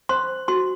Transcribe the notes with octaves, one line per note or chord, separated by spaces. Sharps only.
C5 C6
F#4 C6